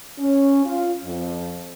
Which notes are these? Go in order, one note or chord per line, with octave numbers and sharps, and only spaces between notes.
C#4
F4
F2